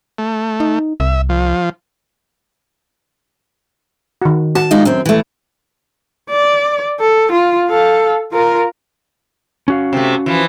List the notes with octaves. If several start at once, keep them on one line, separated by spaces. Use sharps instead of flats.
A3
D#4
C2 E5
F3
D#3 F#4
F#4 A5
G#3 D#4 F4
F#2 C4
E3 A3
D5
A4
F4
A4 F5
F4 A#4
C#4 F#4 F5
C3 A3
E3 F3